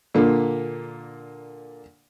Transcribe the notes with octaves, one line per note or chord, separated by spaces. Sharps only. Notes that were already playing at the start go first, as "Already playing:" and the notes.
A#2 D3 A#3